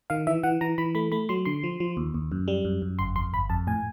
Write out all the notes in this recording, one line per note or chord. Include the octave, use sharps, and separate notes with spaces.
D#3 F5
E3 E5
E3 F#5
E3 A#5
E3 B5
A3 B5
A3 B5
F#3 C6
D3 C6
F3
F3
D#2
D#2
F#2
G3
F#2
F#2
G1 C6
F2 C6
G1 B5
F2 A5
A2 G#5